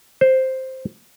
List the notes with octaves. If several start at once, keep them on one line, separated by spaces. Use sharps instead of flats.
C5